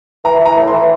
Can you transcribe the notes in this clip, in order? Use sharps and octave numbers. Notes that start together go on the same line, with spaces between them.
E3 A#5
E3
A#5
A2
E3 C6